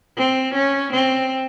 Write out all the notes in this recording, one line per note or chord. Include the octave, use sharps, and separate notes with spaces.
C4
C#4
C4